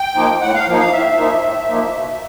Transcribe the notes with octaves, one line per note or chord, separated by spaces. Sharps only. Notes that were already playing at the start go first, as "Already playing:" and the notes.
Already playing: G5
F3 A#3 D#4
A2 F#5
F5
F3 A#3 D#4
F5
A2 E5
F3 A#3 D#4
A2
F3 A#3 D#4
B2